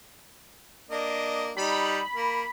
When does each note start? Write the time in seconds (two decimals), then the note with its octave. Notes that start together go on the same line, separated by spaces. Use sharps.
0.91 A#3 D4 D#5
1.57 G3 D#4 B5
2.14 A#3